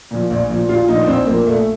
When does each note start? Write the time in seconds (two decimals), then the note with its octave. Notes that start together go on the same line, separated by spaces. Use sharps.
0.11 A#2 F3
0.31 A#1
0.50 A#2 F3
0.69 A#1 F4
0.88 A#2 F3 D#4
1.03 D4
1.07 A#1 C4
1.27 A#2 F3 A#3
1.46 A#1 A3